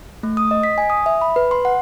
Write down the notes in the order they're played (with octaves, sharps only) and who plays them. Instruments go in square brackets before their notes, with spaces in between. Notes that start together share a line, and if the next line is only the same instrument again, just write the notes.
[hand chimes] A3
D#6
D#5
B6
G#5
D#6
E5
B5
B4
C6
F#5